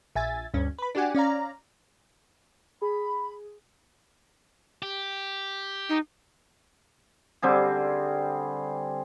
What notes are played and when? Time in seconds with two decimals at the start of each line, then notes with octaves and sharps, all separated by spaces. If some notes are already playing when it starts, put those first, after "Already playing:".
0.15 A#1 E5 G#5 A6
0.54 D2 G2 C#4
0.79 B4 B5
0.95 D4 F#4 G4 D5 F#5 G#5
1.15 C#4 D5 F5 A#5
2.82 G#4 B5
4.83 G4
5.89 D#4
7.42 D3 G3 C4 G#4